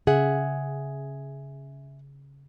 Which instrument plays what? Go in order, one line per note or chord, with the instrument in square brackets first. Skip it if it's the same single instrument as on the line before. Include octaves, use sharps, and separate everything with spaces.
[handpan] C#3 [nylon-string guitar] G#4 E5 F#5